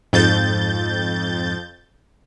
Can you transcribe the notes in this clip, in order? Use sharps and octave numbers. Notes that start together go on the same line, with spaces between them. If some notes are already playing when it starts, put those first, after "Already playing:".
F2 G#2 G6 A6